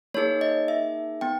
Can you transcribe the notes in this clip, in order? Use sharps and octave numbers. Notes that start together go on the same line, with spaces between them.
A#3 D#4 G#4 C#5
D#5
E5
B3 G5